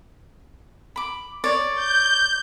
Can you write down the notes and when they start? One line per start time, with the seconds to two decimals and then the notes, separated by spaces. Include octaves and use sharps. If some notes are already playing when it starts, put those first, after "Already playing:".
0.96 B5 D6
1.44 C#5 D5
1.74 G6